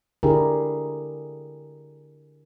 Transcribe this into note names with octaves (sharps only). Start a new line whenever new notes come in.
D3 D4 E4 G4 G#4 A#4